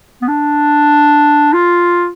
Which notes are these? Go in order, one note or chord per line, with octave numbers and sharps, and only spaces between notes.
B3
D4
F4